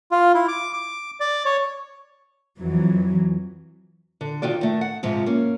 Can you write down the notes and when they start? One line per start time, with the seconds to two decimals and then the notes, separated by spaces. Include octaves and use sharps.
0.11 F4
0.34 E4
0.48 D6
0.73 D6
1.20 D5
1.45 C#5
2.59 F2 E3 F#3
4.21 D3
4.42 C3 D#3 F4 F#4 D5
4.61 D#3 A3
4.81 F#5
5.03 G#2 C3 F3
5.26 A#3 C#4